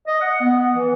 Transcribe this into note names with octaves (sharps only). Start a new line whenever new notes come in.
D#5
F#5
B3
E3